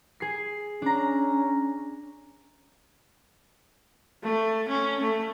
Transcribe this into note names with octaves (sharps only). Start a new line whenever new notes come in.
G#4 C7
C#4 D4 A#5
A3
C#4
A3